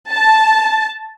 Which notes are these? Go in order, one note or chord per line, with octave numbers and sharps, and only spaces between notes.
A5